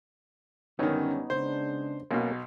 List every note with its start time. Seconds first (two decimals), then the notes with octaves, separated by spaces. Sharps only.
0.79 F#2 D3 D#3 G3 B3 C#4 D#4 C#5
1.30 C#3 G#3 D4 C5
2.11 B1 B2 A#3 C#4 A#4